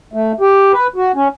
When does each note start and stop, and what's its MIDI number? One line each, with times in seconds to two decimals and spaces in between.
0.14 0.32 57
0.41 0.72 67
0.73 0.87 71
0.96 1.12 66
1.15 1.28 61